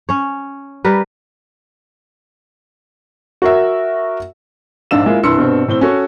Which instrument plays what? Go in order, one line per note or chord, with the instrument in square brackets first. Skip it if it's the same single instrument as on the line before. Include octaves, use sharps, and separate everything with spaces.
[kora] C#4 C#5
G3 A#4 B4
[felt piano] F#4 A#4 E5
[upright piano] A#1 G#2 D4 F5 E6 E7
G#3 A#3 E4 F4
C2 G2 E3 C6 E6 C#7
G2 B2 C4
A2 C4 G7
C#4 F#4 A4 C#6